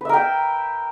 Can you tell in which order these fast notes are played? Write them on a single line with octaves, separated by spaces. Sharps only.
B4 E5 A#4 G5